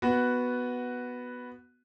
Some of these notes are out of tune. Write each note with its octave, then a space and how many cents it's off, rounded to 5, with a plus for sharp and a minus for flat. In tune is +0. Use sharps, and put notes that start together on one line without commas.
B3 +0 F#4 +0